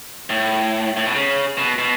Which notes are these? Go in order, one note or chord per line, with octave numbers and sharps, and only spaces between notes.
A2
A2
B2
C#3
B2
B2